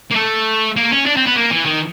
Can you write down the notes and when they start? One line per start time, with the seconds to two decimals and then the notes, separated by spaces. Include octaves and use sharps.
0.11 A#3
0.16 A3
0.76 A#3
0.91 C#4
1.06 D4
1.16 C4
1.26 B3
1.36 A#3
1.51 E3
1.65 D#3